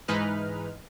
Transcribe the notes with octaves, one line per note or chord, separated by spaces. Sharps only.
G#2 E3 G#3 D#4 B4 F6